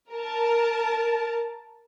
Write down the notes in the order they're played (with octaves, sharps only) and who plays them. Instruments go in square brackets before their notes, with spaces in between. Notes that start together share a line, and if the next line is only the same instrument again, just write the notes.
[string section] A#4 A5